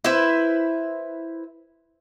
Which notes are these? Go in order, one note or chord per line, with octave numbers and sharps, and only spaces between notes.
E4 B4 C5 E5